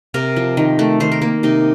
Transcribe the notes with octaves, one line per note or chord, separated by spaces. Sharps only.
C3 A#4
F3
D#3
A3
D#3 C5
A#4
A#3
C3 D#4